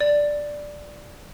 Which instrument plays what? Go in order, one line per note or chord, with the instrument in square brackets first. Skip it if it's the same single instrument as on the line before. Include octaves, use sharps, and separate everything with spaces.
[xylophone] D5